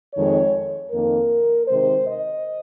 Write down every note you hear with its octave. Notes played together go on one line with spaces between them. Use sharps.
F2 D#3 G#3 C#5
F2 D#3 A#3 A#4
C3 D#3 G#3 C5
D#5